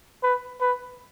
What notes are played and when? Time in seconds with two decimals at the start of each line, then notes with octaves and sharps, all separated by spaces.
0.23 B4
0.61 B4